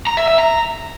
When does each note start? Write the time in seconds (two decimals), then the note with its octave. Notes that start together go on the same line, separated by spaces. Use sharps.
0.07 A#5
0.17 E5
0.28 E5
0.38 A#5